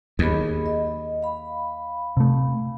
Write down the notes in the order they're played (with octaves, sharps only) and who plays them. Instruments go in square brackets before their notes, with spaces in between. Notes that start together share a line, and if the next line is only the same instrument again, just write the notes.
[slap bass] D#2 [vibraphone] G#4 D#5 B5
[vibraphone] D#5
F5 B5
[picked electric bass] C3 A3